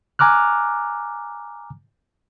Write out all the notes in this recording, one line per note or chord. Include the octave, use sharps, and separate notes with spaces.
G#5 A#5 D6 F6 F#6